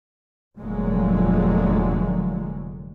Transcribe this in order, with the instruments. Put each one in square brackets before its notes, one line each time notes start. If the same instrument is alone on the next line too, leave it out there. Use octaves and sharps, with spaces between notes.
[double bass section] F1 A#2 D3 F#3 G#3 A#3